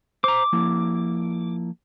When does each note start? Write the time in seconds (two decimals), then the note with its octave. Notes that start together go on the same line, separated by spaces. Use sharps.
0.24 C5 A#5 D6
0.53 F3 A#3 E4